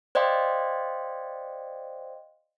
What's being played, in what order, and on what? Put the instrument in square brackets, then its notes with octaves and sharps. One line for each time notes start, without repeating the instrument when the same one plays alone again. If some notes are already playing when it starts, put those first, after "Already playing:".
[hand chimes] C5 D5 D#5 F5 G5 C6